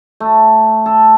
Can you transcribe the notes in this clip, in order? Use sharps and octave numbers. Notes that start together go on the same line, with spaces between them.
A3
A4